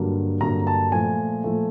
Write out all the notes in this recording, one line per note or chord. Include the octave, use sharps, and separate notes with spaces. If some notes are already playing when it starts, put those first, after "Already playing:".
Already playing: G2 D3 F#3 A#3
G2 D3 F#3 A#3 A#5
A5
A#2 F3 A3 G#5
A#2 F3 A3